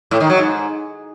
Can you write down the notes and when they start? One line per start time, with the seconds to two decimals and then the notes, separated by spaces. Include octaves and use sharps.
0.11 A2
0.20 D#3
0.29 F#3
0.38 G#2